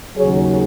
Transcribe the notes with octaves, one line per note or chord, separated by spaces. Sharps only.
D#2 C#3 F#3 G#4 C#5